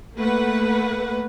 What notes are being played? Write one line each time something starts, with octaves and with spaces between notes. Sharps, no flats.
A3 A#3 B4 F#5